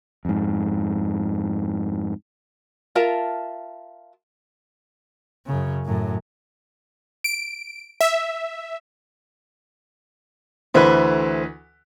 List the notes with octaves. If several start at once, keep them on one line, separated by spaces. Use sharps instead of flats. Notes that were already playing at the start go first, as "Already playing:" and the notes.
F2 G#2
F4 A#4 E5 A5
F#2 C#3
F#2 A2
D7
E5
D2 E3 A4 B4 C5 E5